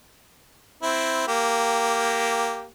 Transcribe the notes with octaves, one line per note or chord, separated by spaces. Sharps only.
C4 E4
A#3 G4